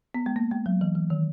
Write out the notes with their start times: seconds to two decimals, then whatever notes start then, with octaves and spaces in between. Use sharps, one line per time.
0.14 B3
0.26 G#3
0.36 A#3
0.51 G#3
0.66 F#3
0.81 E3
0.95 E3
1.10 D#3